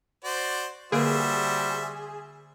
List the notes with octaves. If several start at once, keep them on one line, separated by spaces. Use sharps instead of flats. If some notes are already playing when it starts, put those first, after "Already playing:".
F#4 C5 D5
D3 G3 A#3 F#4 G#4 A#4 C5 E5